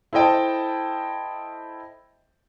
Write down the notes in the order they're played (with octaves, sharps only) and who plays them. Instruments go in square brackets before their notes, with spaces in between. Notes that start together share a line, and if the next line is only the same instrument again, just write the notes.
[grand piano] E4 A4 C5 D#5 G5 A5